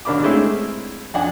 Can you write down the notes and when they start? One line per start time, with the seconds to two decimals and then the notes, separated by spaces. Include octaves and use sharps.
0.05 D#2 D3 D4 A#4 B5 D6
0.23 G#3 A3 C4 C#4 E4 G#4
1.14 F2 D4 F#5 G#5